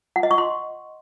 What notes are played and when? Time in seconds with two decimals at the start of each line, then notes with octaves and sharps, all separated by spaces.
0.16 F#5
0.23 D#5
0.31 C#6
0.38 C6